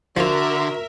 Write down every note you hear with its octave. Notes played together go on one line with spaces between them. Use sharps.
D3 F3 F4 F#4 A#4 E5